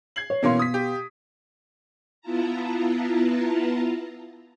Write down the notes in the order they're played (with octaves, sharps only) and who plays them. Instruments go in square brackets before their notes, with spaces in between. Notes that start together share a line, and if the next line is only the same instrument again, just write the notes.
[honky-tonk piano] G#6 C7 F#7
[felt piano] C#5
[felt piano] B2 F5 C6 [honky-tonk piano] E3 A#3 C#4
[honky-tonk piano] D#6 B6
G4
[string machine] B3 E4 F4 A5 A#5